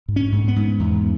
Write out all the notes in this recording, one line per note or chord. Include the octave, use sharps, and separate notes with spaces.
G#2
C#4
G#2
B3
G#2
E2